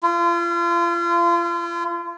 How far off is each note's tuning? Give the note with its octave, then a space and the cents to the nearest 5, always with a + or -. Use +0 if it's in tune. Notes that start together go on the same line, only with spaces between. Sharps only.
F4 -35